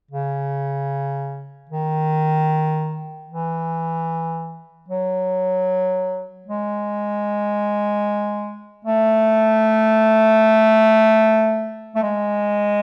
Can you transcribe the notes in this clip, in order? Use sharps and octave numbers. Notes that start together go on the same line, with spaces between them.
C#3
D#3
E3
F#3
G#3
A3
A3
G#3